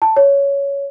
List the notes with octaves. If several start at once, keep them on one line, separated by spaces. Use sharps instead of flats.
A5
C#5